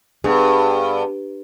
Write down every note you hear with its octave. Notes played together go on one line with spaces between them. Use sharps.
G2 B3 G#4